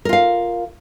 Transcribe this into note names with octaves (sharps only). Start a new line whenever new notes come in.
F4 A#4 F5